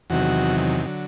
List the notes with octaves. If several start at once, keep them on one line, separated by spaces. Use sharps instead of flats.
E2 C3 D#3 F#3 F#4
D3 F#3